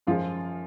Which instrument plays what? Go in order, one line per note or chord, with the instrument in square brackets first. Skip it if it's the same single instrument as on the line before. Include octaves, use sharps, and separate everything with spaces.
[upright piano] F#2 F3 G#3 F4